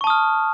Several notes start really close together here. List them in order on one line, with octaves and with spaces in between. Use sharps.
C#6 A5 D#6 F6